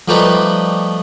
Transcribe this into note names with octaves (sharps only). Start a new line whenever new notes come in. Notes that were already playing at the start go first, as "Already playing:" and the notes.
F3 G3 A3 D#4 B4